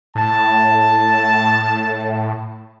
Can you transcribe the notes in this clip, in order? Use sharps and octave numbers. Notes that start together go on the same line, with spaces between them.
A2 A5